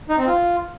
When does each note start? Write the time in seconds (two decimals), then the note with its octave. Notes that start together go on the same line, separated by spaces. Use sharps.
0.09 D#4
0.18 C4
0.27 F4